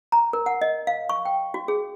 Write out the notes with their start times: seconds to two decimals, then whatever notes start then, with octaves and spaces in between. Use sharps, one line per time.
0.12 A#5
0.33 A#4
0.46 F#5
0.62 D#5
0.87 F5
1.09 C#6
1.25 G5
1.54 F#4
1.68 G#4